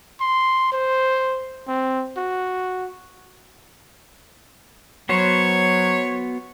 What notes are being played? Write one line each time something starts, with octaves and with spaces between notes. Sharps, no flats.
C6
C5
C4
F#4
F#3 B3 F#4 C5 C#5